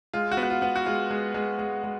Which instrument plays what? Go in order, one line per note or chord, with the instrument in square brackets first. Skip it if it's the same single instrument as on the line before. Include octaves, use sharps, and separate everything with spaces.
[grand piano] G#3 F4
F#4
B3
F#4
F4
B3
F#4
G#3 F4
G#3
G#3
G#3
G#3